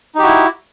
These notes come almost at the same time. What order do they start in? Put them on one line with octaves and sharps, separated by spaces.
D#4 G4 F#4 E4